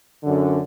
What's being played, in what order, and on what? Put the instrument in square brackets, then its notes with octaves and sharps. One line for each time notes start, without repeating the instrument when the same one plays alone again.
[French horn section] F#2 D3